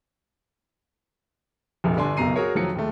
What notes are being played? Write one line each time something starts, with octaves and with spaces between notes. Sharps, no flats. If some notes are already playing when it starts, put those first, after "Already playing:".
F1 A#1
G1 D3 D4 G#5 C6
F#1 B1 B2 A#5 C7 D#7
F#4 G#4 A#4 C#5
F1 D#3 F3 F#3 C#7
D#2 G#3 A3